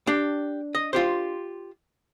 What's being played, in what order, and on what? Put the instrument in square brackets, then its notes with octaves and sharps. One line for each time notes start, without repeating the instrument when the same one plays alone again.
[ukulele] D4 [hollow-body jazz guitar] G4
[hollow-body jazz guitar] D#5
F4 G4 C5